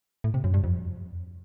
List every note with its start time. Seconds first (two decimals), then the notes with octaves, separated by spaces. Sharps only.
0.24 A2
0.34 C3
0.44 F#2
0.54 G2
0.64 F2